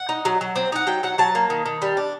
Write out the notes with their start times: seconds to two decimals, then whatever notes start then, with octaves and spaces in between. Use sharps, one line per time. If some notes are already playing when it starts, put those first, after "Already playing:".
Already playing: F#5
0.09 D#4
0.25 F#3
0.41 F#3
0.56 C4
0.72 D#4 F#5
0.87 F#3 G5
1.03 F#3 F#5
1.18 F#3 A5
1.35 A#3
1.50 D#3
1.66 D#3
1.82 G3
1.97 D4